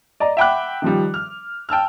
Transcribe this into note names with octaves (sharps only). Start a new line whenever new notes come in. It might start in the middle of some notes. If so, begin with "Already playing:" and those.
D5 D#5 A#5
E5 F#5 G5 B5 D6 F#6
D#3 F3 G3
F6
G5 A5 E6 F6